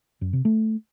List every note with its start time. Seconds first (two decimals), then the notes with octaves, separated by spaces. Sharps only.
0.21 F#2
0.33 C3
0.45 A3